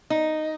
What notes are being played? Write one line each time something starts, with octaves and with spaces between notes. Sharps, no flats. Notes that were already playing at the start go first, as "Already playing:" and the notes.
D#4